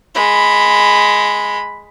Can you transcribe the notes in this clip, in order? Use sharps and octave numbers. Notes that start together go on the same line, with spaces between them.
G#3 B5